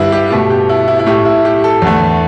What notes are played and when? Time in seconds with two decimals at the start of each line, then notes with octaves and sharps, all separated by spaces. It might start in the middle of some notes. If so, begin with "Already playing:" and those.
Already playing: G2 D3 G3 E4 G4 B4
0.12 G4
0.31 B2 A3 G4
0.50 G4
0.69 E4
0.88 E4
0.99 E4
1.06 A2 A3 G4
1.25 E4
1.45 G4
1.64 A4
1.82 E2 D3 A3